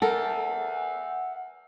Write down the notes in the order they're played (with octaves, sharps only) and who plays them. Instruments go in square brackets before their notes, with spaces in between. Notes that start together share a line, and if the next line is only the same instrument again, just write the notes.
[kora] A4 A#4 [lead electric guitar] E5 F#5